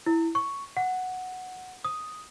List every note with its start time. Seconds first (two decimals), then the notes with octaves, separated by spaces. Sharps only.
0.06 E4
0.35 C#6
0.77 F#5
1.84 D#6